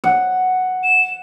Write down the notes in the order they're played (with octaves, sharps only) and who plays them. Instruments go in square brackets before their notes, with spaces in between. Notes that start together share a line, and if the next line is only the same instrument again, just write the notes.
[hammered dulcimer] F#5
[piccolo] E7